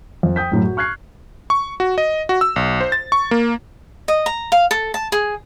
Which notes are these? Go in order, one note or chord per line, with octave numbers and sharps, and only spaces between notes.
F2
G5 D#6 G6 B6
F#2 A2 F#3
F#4
C#6 F6 F#6 G#6 C7
C#6
F#4
D#5
F#4
E6
B1
C5
A6
C#6
A#3
D#5
A#5
F5
A4
A5
G#4